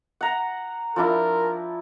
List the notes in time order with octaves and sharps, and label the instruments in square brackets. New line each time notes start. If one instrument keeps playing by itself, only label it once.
[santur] F#5 A#5
[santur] F3 D4 E4 [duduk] A#4